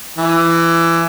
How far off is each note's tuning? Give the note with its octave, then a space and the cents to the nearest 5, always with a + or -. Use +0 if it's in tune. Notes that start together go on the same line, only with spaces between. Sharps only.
E3 +20